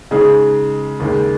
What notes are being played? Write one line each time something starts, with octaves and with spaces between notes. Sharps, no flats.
C#3 G#3 D#4 G#4
D#2 C#3 G#3